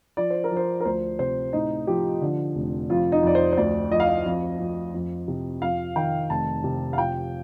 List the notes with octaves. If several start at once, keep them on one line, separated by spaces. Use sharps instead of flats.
F3 D5
C5
A#4
F3
C5
A#4
D2 C5
C3 C5
A2 D#4
F3 G4
D3
F1
F2 F4
D#4
F2 D5
C5
C5
D2 D5
F3 D#5
F5
D#5
F2
F2
F2
C3
F2 F5
D#3 G5
F1 A5
C3
F5
F3 G5